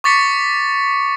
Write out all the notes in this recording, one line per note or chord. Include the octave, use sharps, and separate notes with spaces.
C#6 D6 A6 B6 C#7